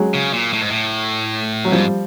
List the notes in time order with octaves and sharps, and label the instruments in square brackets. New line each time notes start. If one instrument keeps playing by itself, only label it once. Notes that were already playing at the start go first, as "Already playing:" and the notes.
Already playing: [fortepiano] F#3 G#3
[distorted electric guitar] C#3
A#2
A2
G#2
A2
[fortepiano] F#3
[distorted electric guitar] G#2 [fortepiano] F3 G3